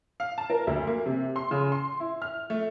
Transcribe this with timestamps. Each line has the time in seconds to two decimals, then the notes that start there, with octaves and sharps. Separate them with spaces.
0.20 F5
0.38 A5
0.50 A#4
0.67 D2
0.87 A#3
1.06 C3
1.36 C6
1.51 C#3
1.72 C6
2.00 E4
2.22 F6
2.50 A3